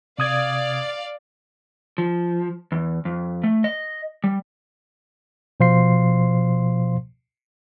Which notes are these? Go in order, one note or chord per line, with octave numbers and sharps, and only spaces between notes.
C3 D5 F5 D#6 G#6
F3
E2
F2
A3
D#5
G3
B2 F3 C5 F5 C6 C7